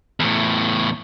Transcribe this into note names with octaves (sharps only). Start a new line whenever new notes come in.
E2 A2